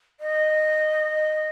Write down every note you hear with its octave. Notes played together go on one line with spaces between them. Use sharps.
D#5